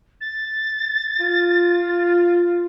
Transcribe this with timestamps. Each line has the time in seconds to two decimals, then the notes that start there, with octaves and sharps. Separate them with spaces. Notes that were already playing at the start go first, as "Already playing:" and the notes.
0.21 A6
1.20 F4